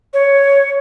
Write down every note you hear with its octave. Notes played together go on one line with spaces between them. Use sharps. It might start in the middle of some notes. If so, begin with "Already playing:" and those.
C#5